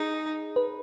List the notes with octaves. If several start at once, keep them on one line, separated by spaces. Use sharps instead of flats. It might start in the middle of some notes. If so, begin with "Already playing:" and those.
Already playing: D#4 G#4
B4